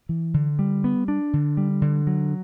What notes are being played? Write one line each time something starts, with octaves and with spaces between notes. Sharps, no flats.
E3
D3
G3
B3
D4
D3
G3
D3
F#3